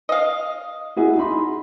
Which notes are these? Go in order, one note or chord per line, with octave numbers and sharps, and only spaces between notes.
D#5 F5
E4 F#4 G#4
D#4 B5 C6